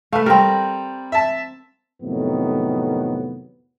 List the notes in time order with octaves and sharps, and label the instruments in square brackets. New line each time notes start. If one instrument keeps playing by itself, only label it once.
[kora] A3 B4 [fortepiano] F5
[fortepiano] G3 [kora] C4 A#4
[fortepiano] E5 A5
[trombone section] F2 A2 C3 D#3 F#3 B3